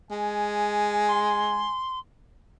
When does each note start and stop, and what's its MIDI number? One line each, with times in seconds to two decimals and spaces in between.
0.11 1.69 56
0.11 1.78 80
1.08 1.99 84